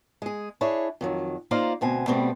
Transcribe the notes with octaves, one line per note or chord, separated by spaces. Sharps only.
G#3 G#4
D4 E4 G#4 C#5
F2 D#3 F#3
A#3 D#4 F4 C5 D5 F5
D2 B2 C4 G#5
B2 G3 A3 B3 C4